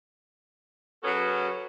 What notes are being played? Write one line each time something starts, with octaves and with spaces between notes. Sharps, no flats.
C#3 F#3 B3 C#4 F#4 A4